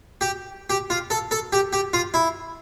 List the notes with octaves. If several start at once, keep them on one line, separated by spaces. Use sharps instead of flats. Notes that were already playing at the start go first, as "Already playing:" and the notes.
G4
G4
F4
A4
A4
G4
G4
F4
E4